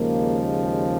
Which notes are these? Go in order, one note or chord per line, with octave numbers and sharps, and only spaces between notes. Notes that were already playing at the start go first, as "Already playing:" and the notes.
Already playing: D#2 C#3 F3 G#3 A#3